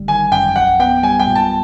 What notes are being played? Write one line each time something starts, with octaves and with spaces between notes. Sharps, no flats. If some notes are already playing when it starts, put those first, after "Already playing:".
Already playing: G1 D3 G3
D#3 G#5
F#2 G5
A#1 F#5
B3 G5
G3 G#5
G5
A#2
A5